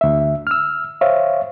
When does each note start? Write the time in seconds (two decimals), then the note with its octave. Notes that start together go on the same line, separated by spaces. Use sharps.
0.01 D2 E5
0.47 E6 F6
1.01 C5 C#5 E5 F5